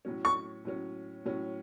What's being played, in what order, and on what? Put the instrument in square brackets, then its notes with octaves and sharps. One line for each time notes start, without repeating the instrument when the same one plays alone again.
[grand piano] A2 F#3 C#4
[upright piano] C#6
[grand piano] A2 F#3 C#4
A2 F#3 C#4